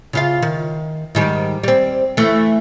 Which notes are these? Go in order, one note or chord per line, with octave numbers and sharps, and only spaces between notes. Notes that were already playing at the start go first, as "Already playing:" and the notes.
C#3 F4 F5
D#3
G#2 D#3 G3
G3 C4
E3 A3